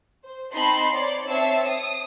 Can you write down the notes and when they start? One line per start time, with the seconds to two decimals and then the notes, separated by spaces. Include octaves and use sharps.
0.25 C5
0.54 C4 D#4 A5 B5 C6 C7
0.94 C#5 D5
1.27 C4 C#5 E5 A5 E6 C7
1.65 D#6